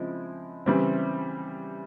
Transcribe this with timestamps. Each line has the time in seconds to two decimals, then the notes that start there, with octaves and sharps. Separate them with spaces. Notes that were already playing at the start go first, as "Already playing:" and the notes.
Already playing: C#3 F3 G#3 C4 E4
0.66 C#3 E3 G3 C4